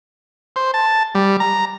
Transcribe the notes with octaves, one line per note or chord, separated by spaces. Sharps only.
C5
A5
G3
A#5